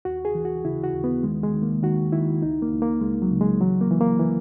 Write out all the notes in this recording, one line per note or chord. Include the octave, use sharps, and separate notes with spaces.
D#2 F#4
G#4
E3
F#4
C#3 E4
F#4
D#2
B3
D#3 G#3
G#3
D#3
A#3
D#3 F#4
D#3 E4
C#2 D#4
A#3
C#2
A#3
C#2 G#3
F#3
C#3
G#3
E3 F#3
A#3
E3
A#3
E3